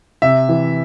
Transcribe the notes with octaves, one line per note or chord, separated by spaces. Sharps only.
C3 E5
E3